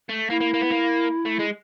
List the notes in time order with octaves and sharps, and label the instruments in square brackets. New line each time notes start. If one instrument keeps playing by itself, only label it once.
[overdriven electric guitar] A3
[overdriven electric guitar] A#3 [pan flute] E4
[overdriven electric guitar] A#3
A#3
B3
A#3
A3
G#3